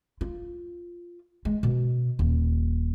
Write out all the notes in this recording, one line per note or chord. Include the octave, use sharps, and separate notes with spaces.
F4
G#3
B2
D#1